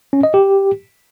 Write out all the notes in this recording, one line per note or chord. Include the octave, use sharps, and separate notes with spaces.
C#4
D#5
G4